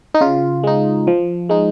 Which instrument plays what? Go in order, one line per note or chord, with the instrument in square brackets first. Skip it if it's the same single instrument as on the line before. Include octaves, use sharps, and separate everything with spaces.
[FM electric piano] D#4
C#3 F4
G#3 D#4
F3
G#3 D#4